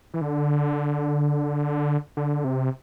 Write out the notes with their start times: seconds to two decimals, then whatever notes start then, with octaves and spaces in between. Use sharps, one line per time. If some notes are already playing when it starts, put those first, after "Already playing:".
0.14 E3
0.21 D3
2.17 D3
2.44 C3